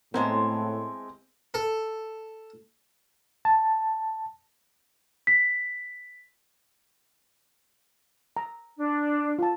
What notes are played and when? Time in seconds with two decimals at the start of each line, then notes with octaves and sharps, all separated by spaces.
0.14 A2 E3 G#3 B3 C4 A#4 D#5 A5
1.54 A4
3.45 A5
5.27 B6
8.37 A#5
8.77 D4
9.39 F4 A5